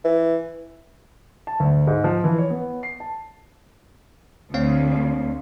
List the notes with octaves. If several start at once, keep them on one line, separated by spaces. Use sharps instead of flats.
E3
A5
D2
G#2
F3
E3
C#5
B3
C7
A5
D2 C4 C#5 F5